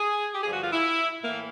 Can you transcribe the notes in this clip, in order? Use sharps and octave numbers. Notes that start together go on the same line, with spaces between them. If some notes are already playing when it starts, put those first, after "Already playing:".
Already playing: G#4
G4
G2 D3 F3 G#4
F#4
F4
E4
A2 E3 A#3